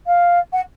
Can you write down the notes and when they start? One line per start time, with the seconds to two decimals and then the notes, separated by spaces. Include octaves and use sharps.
0.06 F5
0.52 F#5